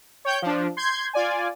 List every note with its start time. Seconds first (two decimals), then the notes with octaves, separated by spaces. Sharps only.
0.25 C#5 G5 G6
0.42 F3 D4
0.77 C6 G6 G#6
1.14 F4 D5 G#5